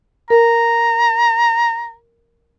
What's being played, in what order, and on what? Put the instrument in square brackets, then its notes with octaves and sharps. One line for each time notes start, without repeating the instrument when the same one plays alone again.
[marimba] A#4 [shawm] A#5